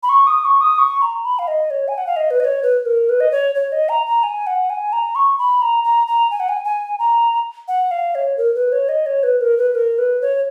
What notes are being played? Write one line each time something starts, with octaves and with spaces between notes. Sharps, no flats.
B5
C#6
D#6
C#6
D#6
C#6
A#5
B5
F5
D#5
C#5
G#5
F#5
F5
D#5
B4
D#5
C#5
B4
A#4
B4
D#5
C#5
C#5
D#5
A#5
A#5
G#5
F#5
G#5
A#5
C#6
B5
A#5
A#5
A#5
G#5
F#5
G#5
G#5
A#5
F#5
F5
C#5
A#4
B4
C#5
D#5
C#5
B4
A#4
B4
A#4
B4
C#5